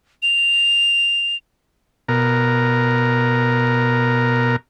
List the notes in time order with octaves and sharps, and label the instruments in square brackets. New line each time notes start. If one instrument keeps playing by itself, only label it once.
[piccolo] F7
[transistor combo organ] B2 A#4